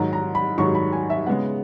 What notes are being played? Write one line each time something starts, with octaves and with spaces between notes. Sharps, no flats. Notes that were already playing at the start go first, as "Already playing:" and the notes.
Already playing: G#2 D#3 F#3 A#5
A#5
B5
G#2 D#3 F#3 C#6
B5
G#5
E5
C#3 G#3 B3 F#5